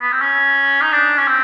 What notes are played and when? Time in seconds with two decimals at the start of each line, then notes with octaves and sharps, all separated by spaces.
0.02 B3
0.12 C4
0.21 C#4
0.82 D#4
0.93 D4
1.18 C#4
1.28 C4